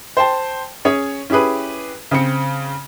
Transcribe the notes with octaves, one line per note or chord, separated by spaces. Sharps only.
C5 G5 A5
C#4 G#4 C#5
C#4 E4 G4 G#4 B4
C#3 C4 C#7